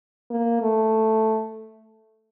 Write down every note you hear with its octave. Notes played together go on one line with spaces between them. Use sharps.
A#3
A3